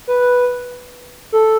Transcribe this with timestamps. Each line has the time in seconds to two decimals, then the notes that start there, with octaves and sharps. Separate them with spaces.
0.07 B4
1.32 A4